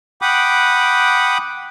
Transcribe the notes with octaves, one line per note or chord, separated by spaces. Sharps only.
F#5 G5 B5 D6 D#6